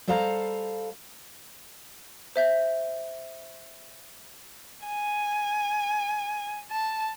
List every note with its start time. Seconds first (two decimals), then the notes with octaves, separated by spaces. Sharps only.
0.07 G3 A4 C5 F5 A#5
2.36 C5 E5 G6
4.86 G#5
6.71 A5